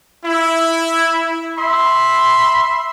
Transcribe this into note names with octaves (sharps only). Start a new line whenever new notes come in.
E4
E5 B5 C6